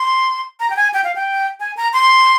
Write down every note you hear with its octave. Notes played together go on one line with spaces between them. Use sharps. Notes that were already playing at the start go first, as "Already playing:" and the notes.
Already playing: C6
A#5
G5
G#5
G5
F5
G5
G#5
A#5
C6